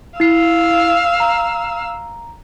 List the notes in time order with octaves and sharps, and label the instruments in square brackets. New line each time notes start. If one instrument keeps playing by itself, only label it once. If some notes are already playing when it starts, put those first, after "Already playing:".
[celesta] E4 C7 [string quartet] F5 E6
[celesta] A#5